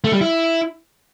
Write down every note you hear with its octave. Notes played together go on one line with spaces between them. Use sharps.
A3
G3
E4